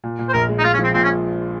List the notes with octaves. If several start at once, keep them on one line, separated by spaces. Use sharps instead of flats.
A#2
A#2
C5
A#1 A#4
G#3
D#4
G#3 F4
C#4
F3
C4
A#2 C4
C#4